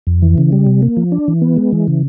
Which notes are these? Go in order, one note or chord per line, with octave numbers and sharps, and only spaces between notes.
F2
E3
C#3
G3
C3
A#3
F3
D4
E3
B3
G#3
E3
C#3